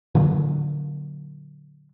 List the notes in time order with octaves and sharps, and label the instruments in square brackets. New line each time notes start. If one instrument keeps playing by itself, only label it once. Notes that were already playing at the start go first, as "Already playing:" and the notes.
[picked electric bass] A#2 D3 E3 F#3